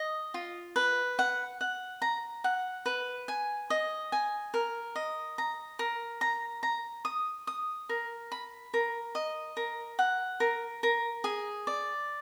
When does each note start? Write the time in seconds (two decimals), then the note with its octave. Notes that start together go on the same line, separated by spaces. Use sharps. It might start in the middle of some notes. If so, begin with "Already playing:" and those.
Already playing: D#5
0.34 F4
0.76 B4
1.19 F#5
1.61 F#5
2.02 A#5
2.44 F#5
2.86 B4
3.28 G#5
3.70 D#5
4.12 G#5
4.54 A#4
4.95 D#5
5.38 A#5
5.79 A#4
6.21 A#5
6.63 A#5
7.05 D#6
7.47 D#6
7.89 A#4
8.32 B5
8.74 A#4
9.15 D#5
9.57 A#4
9.99 F#5
10.40 A#4
10.83 A#4
11.24 G#4
11.67 D5